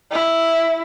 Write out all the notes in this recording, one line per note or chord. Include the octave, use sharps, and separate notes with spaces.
E4